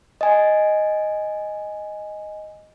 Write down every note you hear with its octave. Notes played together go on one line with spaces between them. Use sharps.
D#5 G#5